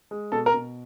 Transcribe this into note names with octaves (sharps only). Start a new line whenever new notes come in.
G#3
B2 A4 A5
A#4 A#5
B2